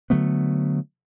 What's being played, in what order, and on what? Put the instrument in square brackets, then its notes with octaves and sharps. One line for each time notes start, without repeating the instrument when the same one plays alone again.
[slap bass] D3 F#3 A3 B3